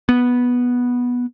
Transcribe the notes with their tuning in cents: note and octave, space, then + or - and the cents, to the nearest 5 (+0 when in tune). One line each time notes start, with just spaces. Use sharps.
B3 -10